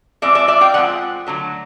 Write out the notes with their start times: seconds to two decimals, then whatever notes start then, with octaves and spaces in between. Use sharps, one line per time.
0.22 F3 G#3 C4 D5 E5
0.35 D5 E5
0.48 D5 E5
0.61 F5 G5
0.74 F3 G#3 C4 F#5
1.26 D3 F#3 A3